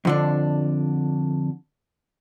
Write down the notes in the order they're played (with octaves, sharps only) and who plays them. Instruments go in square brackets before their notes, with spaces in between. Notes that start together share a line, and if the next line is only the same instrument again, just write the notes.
[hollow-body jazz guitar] F2 D3 D4